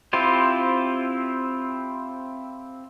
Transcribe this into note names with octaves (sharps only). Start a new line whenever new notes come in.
C4 E4 F4 G4